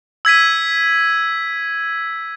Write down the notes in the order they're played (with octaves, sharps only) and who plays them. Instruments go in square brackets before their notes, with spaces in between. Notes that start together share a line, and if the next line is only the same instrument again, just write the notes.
[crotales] E6 G#6 B6 D#7